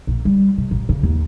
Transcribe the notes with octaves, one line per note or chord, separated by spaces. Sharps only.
A#1
G3
C3
A1
C#3
D#2